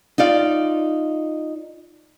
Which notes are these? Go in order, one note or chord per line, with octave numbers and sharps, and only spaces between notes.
D#4 F4 D5 F5